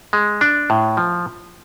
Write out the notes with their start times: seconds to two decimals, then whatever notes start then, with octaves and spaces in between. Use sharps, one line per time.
0.13 G#3
0.41 D4
0.70 A2
0.97 F3